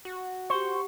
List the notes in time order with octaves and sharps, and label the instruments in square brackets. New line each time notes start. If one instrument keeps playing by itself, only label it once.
[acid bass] F#4
[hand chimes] G4 F#5 [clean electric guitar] C5 [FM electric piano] C#6